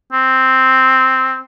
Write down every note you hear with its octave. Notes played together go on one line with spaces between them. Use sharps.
C4